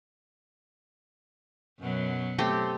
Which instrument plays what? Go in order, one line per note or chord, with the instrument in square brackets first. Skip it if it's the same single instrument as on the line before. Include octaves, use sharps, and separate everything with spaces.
[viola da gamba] F#2 B2 F#3
[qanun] A3 C4 G4